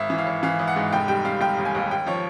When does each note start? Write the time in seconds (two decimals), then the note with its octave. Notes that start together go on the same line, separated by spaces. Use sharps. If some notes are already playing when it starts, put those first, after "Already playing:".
Already playing: G#1 E5
0.10 E3
0.18 F5
0.27 G#1
0.43 E3 F5
0.59 G#1
0.68 F#5
0.76 G#2
0.93 F1 G5
1.08 G3 G5
1.25 G3 F5
1.41 F1 G5
1.58 D#2
1.65 G#5
1.75 D#2
1.91 D#2 G5
2.06 F3 C#5